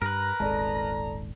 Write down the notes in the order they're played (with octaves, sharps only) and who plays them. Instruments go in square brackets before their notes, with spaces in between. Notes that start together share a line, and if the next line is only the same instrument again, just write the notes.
[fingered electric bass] G2 [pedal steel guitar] A#4 B4 [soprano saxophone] A#5
[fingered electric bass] D#1 G#1 G#3 [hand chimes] A4 D5 A5